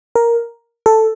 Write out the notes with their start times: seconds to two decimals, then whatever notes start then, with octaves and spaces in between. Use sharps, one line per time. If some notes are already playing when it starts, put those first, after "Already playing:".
0.16 A#4
0.86 A4